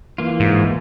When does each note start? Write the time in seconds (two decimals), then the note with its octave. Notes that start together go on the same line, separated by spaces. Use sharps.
0.18 E3 A#3 F4
0.40 G#2